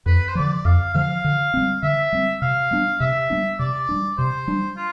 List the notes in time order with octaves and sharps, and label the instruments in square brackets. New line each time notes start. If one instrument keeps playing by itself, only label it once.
[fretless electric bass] F2 [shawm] B4
[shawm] C5
[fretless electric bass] D3 F3 [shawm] D5
[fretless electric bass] F2 [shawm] F5
[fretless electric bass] D3 F3 [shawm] F5
[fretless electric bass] D3
G3 C4
[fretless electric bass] D3 [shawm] E5
[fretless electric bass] G3 C4
[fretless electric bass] C3 [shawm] F5
[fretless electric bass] G3 B3 D4
[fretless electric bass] C3 [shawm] E5
[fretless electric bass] G3 B3 D4
[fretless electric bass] C3 [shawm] D5
[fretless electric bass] G3 D4
[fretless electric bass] C3 [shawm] C5
[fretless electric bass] G3 D4
[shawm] F4